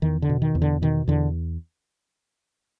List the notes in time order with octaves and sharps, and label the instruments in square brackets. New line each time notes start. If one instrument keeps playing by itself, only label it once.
[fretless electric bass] E2 D#3
D3
B2
D#3
E2
D3
B2 D#3
E2 D3